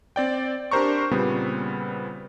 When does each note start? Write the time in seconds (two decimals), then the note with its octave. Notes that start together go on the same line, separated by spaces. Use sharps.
0.16 C4 D5 G5
0.71 D4 G4 A#4 C5 A#5 C#6
1.11 A#2 C#3 G3 B3 C4